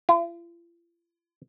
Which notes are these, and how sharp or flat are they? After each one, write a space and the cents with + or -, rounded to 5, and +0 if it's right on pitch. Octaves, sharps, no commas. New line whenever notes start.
F4 -45